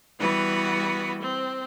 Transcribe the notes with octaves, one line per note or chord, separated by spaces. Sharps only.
E3 G3 B3 F#4 B4
C4